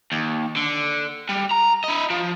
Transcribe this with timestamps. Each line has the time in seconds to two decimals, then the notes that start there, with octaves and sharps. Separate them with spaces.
0.12 D#2
0.56 D3
1.29 G3
1.52 A#5
1.84 E4 D#5
2.10 F3